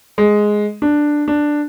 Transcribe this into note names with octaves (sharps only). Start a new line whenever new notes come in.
G#3
D4
D4